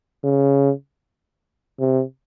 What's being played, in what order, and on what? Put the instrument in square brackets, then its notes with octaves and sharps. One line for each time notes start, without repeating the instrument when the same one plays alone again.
[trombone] C#3
C3